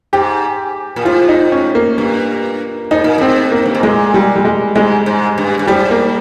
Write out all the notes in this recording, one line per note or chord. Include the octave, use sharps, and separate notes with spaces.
G#2 G4
A#2
G#2 F4
D#4
C#4
A#3
G2
G#2 D#4
A#2
G#2 C4
A#3
G2
G#2
A#2 G#3
G3
G3
G#3
G#2 G#3
G#2
G2
G2
G#2 G3
A#3